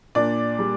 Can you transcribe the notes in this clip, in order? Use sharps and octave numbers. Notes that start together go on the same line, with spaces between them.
A#2 D4 D5
G3